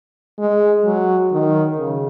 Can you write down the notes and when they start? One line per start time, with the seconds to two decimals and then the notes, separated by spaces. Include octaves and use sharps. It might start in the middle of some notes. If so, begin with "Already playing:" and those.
0.39 G#3
0.85 F#3
1.33 D#3
1.78 C#3